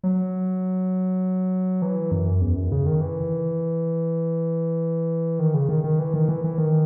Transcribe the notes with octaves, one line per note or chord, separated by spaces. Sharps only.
F#3
E3
F#2
E2
F#2
C#3
D#3
E3
D#3
C#3
D#3
D#3
E3
D#3
E3
E3
D#3